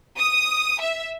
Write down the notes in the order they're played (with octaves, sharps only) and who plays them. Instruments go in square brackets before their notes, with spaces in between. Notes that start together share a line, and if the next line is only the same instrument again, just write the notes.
[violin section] D#6
E5